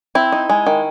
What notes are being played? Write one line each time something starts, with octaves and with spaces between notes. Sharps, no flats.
C4 E4
D#4
G#3
D#3